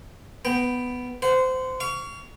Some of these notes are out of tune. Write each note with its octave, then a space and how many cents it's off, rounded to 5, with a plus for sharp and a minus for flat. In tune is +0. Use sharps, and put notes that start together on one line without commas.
B3 +5 G5 +0
C5 -20 F#5 +0
F5 -20 C#6 +25